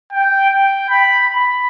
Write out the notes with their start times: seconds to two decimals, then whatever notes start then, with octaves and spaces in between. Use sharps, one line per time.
0.12 G5
0.50 G5
0.90 B5
1.28 B5